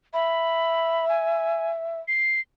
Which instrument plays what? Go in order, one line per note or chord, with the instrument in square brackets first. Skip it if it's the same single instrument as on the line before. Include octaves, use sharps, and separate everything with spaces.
[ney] E5 [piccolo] B5
[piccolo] G#5
C7